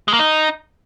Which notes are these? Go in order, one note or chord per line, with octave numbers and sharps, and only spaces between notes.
G#3
A#3
D#4